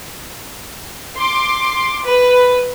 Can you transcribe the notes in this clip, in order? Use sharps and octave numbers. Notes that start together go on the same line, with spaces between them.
C6 D6
B4